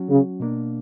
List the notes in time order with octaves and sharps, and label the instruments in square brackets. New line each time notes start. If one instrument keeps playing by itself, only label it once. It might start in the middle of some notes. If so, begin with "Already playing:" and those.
Already playing: [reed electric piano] F#3 C#4 F#4
[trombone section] C#3
[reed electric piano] B2 A#3 D4